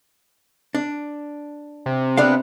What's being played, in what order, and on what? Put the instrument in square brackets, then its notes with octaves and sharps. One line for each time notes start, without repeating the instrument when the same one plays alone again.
[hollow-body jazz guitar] D4
[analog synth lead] C3
[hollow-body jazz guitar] B3 D4 F5